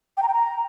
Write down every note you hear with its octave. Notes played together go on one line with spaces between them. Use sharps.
G5
A#5
G5
A#5